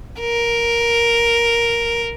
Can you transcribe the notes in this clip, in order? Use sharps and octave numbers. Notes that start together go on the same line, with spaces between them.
A#4